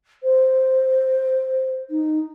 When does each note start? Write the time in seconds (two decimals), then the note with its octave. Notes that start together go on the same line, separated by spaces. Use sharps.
0.23 C5
1.90 D#4